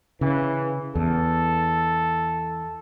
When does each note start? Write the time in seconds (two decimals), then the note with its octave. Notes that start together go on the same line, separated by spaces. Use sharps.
0.21 C#3 E3
0.95 E2 A4